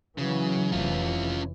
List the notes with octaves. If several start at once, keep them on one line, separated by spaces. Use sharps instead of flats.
C#3 E3 F#3
F1 E3 C#4 F4